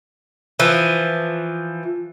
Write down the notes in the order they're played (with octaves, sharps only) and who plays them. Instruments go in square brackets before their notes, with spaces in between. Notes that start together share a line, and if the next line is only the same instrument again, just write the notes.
[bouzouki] E3 F3